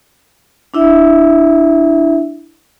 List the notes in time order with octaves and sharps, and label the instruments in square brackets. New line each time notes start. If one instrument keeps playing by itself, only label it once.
[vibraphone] D4 E4 E5